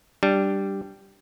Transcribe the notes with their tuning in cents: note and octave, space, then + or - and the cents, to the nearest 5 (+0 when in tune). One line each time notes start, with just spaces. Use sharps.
G3 -5 D4 +0